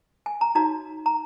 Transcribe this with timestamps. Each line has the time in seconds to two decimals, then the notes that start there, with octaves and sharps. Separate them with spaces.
0.26 G#5
0.41 A#5
0.55 D#4 F#4 C#5 A#5
1.06 A#5